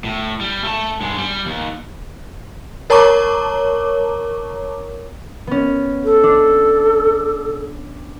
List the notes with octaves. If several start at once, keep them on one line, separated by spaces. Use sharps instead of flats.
A2
G3
A3 A5
G2 G#3
G3
D#2
A#4 C#5 A5 A#5 C#6 D6
B3 C#4
A4
D4